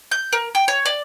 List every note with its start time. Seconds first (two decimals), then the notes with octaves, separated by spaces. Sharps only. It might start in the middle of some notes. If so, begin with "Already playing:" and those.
0.11 G6
0.33 A#4
0.55 G5
0.68 C#5
0.86 D5